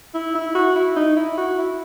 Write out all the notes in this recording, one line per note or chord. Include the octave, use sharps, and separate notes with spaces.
E4
E4
F#4
E4
D#4
E4
F#4
E4